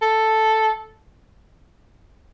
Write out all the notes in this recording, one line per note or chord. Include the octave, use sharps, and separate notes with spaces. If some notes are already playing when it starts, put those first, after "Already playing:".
A4